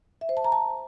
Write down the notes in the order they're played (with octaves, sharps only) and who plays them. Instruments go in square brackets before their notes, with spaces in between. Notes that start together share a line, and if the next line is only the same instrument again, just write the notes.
[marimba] E5
C5
A5
A#5
A5